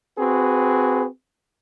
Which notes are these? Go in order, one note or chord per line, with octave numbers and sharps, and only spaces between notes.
C4 F#4 G#4 B4